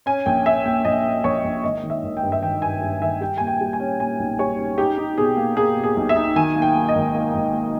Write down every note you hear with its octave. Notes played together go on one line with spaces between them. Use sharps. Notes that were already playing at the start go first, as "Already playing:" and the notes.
C#4 G#5
A#1 G5
C#4 E5
A#2 G5
A#1 D#5
C#4
A#1 C#5
A#1
G#1 D#5
D#3
E5
G#1
G5
G2
E5
D#3 G5
G2 G#5
G2
D#3 E5
G3 G5
A#2 G#5
G5
G3
G#5
C#4
A#2 G#5
B1
G3 C#5
C#4
D#4 G4
D#4
B2 G#4
A#3
A#3 G#4
B2
G#4
B1
E5
D#4
D#3 G#5
A#3
G5
A#3
D#5
G#1
A#3
G#1
A#3